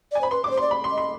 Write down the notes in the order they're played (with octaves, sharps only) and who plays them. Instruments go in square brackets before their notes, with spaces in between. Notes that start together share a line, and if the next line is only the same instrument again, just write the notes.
[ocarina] D5 [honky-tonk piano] G#5
[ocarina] C5 [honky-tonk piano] B5
[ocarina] B4 [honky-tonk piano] C6
[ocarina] D5 [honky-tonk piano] D6
[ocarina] C5
[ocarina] D5 [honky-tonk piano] C6
[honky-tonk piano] B5
C6
[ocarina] D#5
[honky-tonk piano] C6